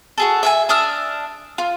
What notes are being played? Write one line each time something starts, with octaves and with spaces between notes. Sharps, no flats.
F#4 G#4 A4
E5 F5 G#5
D4 E5 D#6 F6
F4